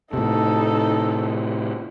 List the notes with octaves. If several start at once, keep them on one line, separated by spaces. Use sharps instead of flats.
A2 C3 D#4 A4